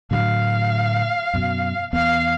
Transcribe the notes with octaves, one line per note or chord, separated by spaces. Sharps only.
A2 D3 F#3 F5
F#2 B2
E2 B3 F5